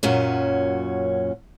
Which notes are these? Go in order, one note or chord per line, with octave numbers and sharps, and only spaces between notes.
F#2 A#2 F#3 C#4